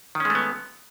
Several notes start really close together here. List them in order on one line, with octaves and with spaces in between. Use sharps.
D#3 C#4 G#3 A3 B3